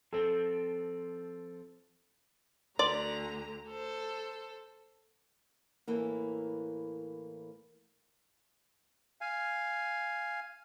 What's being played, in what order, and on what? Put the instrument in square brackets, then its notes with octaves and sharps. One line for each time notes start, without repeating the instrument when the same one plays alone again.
[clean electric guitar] F3 C4 [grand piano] A4
[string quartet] D2 D3 A#5 [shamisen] D5 [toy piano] C6
[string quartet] A4 C5
[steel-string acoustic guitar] A2 E3 A#3
[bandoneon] F5 G#5